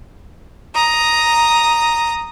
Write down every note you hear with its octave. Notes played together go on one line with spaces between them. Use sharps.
A#5 D#6